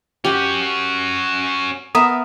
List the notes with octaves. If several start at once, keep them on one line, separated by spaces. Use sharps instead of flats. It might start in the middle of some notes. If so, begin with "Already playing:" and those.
C#4 F#4 G4 F#5
B3 A#4 E5 D#6